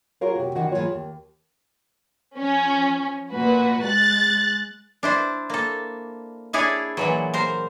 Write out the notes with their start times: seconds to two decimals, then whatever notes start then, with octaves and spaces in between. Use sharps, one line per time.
0.21 F4 F#4 G#4 A#4 C#5 F5
0.35 C3 F#4
0.55 D#3 E3 D4 F#4 D#5 F#5
0.71 G#2 E3 G#3 A#3 F4 C#5
0.89 D#2
2.35 F3 C#4
3.32 A#2 F#4 B4
3.84 G#3 F#6 A6
5.03 D4 E4 C5
5.50 A#3 A4
6.53 D4 E4 G#4 C#5 D5
6.97 A#2 E3 F#3
7.34 A#4 C5